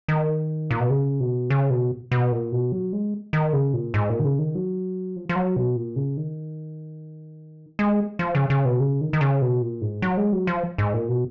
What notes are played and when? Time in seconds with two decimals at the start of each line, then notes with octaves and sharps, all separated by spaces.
0.08 D#3
0.71 A#2
0.80 B2
0.90 C#3
1.20 B2
1.50 C#3
1.70 B2
2.12 B2
2.32 A#2
2.52 B2
2.72 F#3
2.93 G#3
3.33 D#3
3.53 C#3
3.74 A#2
3.94 G#2
4.10 A#2
4.19 D#3
4.25 C#3
4.39 D#3
4.55 F#3
5.16 F3
5.29 F3
5.36 F#3
5.56 B2
5.76 A#2
5.96 C#3
6.17 D#3
7.79 G#3
8.19 F3
8.35 C#3
8.50 C#3
8.65 B2
8.80 C#3
9.01 D#3
9.13 D#3
9.21 C#3
9.42 B2
9.62 A#2
9.81 G#2
10.02 F#3
10.17 G#3
10.32 F#3
10.47 F3
10.78 G#2
10.94 A#2
11.09 B2